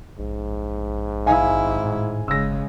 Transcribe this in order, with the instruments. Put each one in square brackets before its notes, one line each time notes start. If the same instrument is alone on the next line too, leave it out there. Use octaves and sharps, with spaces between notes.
[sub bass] A#1 [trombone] G#2
[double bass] G#1 E4 [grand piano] F5 G#5
[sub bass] A2
[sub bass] F#1 [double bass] C#3 G#3 [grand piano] E6 A#6